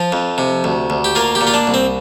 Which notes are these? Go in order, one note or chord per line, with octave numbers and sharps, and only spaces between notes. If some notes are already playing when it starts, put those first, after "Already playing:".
Already playing: F3 F4
F2
C3
D2
D2
G4
A#3 F4
G4
A#2
F4
D4
C2
C4